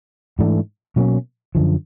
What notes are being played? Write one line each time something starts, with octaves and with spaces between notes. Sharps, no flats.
G#2 E3 A3 D4
B2 F#3 A#3 C#4
F#2 D3 F3